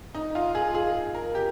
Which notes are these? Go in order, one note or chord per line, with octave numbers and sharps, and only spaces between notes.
D#4
F4
G#4
G#4
A#4
G4